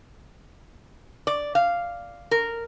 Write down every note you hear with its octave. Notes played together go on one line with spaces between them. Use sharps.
D5
F5
A#4